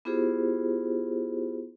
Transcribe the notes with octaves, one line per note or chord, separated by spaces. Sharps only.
B3 E4 F4 G4 G#4 C5